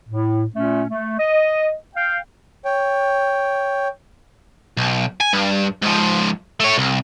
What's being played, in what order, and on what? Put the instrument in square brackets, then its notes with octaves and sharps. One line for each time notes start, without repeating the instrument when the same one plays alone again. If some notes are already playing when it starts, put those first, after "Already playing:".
[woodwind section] A2
A#2 A3 C#4
A3
D#5
F5 G5
[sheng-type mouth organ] C#5 G5
[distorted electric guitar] B1
G#5
G2
G#2 F3
A3 C#5
C2